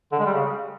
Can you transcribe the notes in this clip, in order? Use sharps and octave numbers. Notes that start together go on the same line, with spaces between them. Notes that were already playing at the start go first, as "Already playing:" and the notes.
D3
G#3
G3
C#3